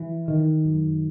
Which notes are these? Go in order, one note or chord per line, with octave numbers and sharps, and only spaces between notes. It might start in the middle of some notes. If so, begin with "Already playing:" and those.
Already playing: E3
D#3
F#2